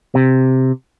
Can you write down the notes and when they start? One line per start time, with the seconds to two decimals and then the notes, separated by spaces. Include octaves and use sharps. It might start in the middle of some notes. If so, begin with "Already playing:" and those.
0.15 C3